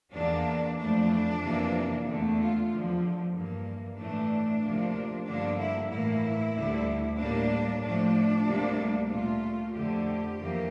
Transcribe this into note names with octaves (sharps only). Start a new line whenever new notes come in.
E2 E3 A#3 D4
F2 E3 A3 D4
F2 C3 E3 A#3
E2 D3 A3
F4
E2 D3 F3
G2 E3 A#3
A2 E3 A3 D4
D2 C3 F3 A#3
G2 D3 F3 A#3 D4
E4
A2 E3 A#3 E4
D2 D3 G3
A2 G3 A#3 D4
A2 F3 A3 D4
D2 C3 G3 A#3
A#2 A3 F4
F2 D3 A3 G4
F2 E3 A#3